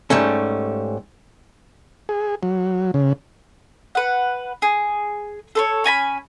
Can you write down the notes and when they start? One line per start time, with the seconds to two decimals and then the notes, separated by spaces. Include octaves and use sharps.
0.10 G#2 G3 A3 C#4
2.09 G#4
2.43 F#3
2.94 C#3
3.95 B4 F#5
4.62 G#4
5.55 A4 C5 C#5
5.84 C#4 G#5 A#5 B5